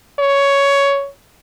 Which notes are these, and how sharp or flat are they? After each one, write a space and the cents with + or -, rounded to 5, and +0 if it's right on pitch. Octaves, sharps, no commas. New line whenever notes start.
C#5 +10